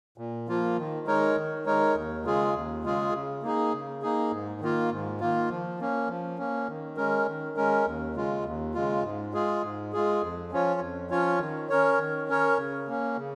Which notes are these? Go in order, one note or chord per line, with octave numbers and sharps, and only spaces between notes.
A#2
F3 A#3 F4
D#3
G#3 D#4 A#4 C#5
D#3
G#3 D#4 A#4 C#5
D#2
C#3 G#3 F4 G#4
D#2
C#3 G#3 F4 G#4
C#3
A#3 D#4 G#4
C#3
A#3 D#4 G#4
G#2
D#3 A#3 F4
G#2
D#3 A#3 F4
F3
A#3 C#4
F3
A#3 C#4
D#3
G#3 C#4 A#4
D#3
G#3 C#4 A#4
D#2
C#3 G#3 F4
D#2
C#3 G#3 F4
G#2
G#3 F4 G#4
G#2
G#3 F4 G#4
F2
F3 C#4 F4 C#5
F2
F3 C#4 F4 C#5
D#3
C#4 A#4 C#5
D#3
C#4 A#4 C#5
C#3
A#3 C#4
C#3